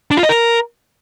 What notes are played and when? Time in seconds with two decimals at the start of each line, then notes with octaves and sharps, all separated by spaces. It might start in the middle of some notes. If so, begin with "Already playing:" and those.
0.11 D4
0.17 F4
0.23 D#5
0.29 A#4